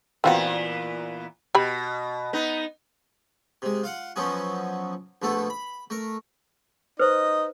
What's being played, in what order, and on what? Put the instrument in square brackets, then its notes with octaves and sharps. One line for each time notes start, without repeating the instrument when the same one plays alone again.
[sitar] A#2 E3 B3 [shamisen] C4 F4 F#4
[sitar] B2 [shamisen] G4 B5
[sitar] B3 D#4
[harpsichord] C3 G#3
F4 F5 F#5
F#2 F3 F#3 B3 C#4
A#1 B2 A3 B3 A4
B5
A3 A#4
[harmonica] D#4 D#5 [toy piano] B4 C5